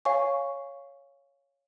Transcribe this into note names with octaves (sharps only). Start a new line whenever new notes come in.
C#5 F5 G#5 C#6